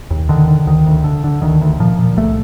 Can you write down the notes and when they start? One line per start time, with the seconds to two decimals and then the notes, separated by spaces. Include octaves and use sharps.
0.10 D#2
0.29 D3 D#3
0.48 D3
0.67 D2 D#3
0.86 D2
1.04 D3
1.24 D3
1.42 D2 D#3
1.61 D2
1.80 A#2 F3
1.98 A#2
2.17 C2 A3